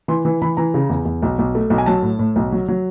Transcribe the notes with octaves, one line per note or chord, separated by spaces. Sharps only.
E3 C6
E3
E3 B5
E3 A#5
C#3
E2
E2
B1
B1
A3
B1
G#5
F#3 A5
A2
A2
B1
F#3
F#3